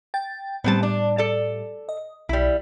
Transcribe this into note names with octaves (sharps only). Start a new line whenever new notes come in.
G5 A6
A2 G3 B3 C4 A5
D4
A4 D5
D#5
B1 G3 E4